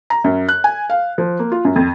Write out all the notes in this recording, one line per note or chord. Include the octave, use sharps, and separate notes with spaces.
A#5
F#2
F#6
G#5
F5
F3
A#3
F4
F#2
F2